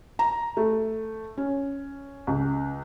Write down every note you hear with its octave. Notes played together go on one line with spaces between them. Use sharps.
A#5
A3
C#4
C#2